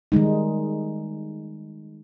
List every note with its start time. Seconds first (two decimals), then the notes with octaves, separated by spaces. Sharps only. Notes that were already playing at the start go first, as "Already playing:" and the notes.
0.12 D#3 G3 G#3 D#4